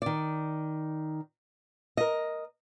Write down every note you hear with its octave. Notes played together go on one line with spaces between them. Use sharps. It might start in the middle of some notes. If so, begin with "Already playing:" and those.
D#3 D5
A#4 D#5